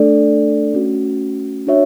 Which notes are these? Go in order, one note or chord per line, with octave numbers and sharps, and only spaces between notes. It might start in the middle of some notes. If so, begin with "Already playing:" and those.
Already playing: A3 D4 A4 D5
A3 C#4 F#4
D4 F#4 C#5 E5